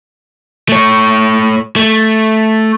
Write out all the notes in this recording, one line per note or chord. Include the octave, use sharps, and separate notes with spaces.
A3 C#5
A3